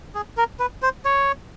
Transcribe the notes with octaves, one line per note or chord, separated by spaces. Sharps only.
G#4
A#4
B4
C5
C#5